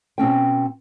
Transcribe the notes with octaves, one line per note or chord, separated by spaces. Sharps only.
B2 C4 C#4 G5